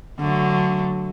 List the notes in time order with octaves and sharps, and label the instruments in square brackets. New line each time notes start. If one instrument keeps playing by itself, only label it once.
[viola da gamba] D3 F#3 A3